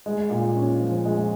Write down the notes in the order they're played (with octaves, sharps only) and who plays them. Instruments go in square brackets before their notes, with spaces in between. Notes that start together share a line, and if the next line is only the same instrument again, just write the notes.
[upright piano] G#3
A#2
C#4
F3
G#3